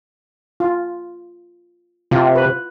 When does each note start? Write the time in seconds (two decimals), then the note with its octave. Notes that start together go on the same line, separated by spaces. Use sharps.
0.60 F4
2.11 C3 F4
2.35 B4